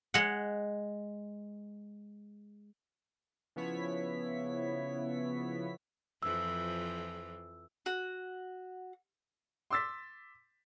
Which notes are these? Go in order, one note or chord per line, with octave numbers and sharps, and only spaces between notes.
G#3 F#5
C#3 F3 B3 E4 C#5 B6
F2 E3 F3 E6
F#4
C6 D6 E6 A6 B6